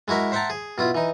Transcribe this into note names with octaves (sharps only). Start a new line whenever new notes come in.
G#3 E4 F#4 A#4 E5
C5 E5 F#5 G5 A5 A#5
G#4
B2 E4 F4
E3 D#4